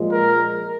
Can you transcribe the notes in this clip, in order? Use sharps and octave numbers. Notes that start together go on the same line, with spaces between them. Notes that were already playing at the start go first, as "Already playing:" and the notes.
Already playing: A#2 F3 G#3
A#4